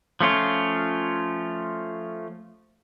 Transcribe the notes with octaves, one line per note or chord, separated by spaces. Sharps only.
F3 A3 C#4 F4